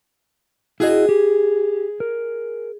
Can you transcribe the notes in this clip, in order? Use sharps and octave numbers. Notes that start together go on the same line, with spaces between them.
E4 F#4 G#4 D#5
G4
A#4